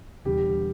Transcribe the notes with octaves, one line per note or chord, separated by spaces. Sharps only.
E1 E2 D3 G3 G4